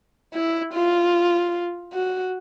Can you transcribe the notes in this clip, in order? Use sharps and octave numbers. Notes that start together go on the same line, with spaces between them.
E4
F4
F#4